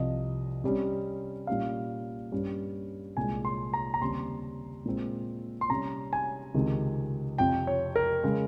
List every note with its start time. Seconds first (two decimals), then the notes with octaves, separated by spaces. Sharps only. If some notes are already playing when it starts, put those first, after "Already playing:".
Already playing: C2 C3 F3 D#5
0.64 C3 G3 C#4
1.47 A#2 G3 C#4 F5
2.32 G2 G3 C#4
3.17 C2 A#2 G#3 G#5
3.45 C6
3.74 A#5
3.94 A#5
4.01 D#2 C#3 G3 C4 C6
4.86 A#2 G#3 C4
5.61 C6
5.70 C3 G3 C#4 A#5
6.13 G#5
6.55 C#2 C3 D#3 G#3
7.38 F2 C3 F3 G5
7.67 C#5
7.96 A#4
8.23 C#3 G#3